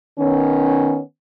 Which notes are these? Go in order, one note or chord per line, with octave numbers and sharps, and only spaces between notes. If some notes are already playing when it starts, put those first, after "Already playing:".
D#3 B3 C#4